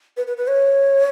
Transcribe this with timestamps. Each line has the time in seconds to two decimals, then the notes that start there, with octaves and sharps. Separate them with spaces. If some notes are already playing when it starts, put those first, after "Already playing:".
0.17 B4
0.27 B4
0.37 B4
0.48 C#5